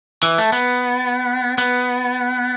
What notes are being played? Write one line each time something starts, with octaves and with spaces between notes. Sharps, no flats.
E3
A3
B3
B3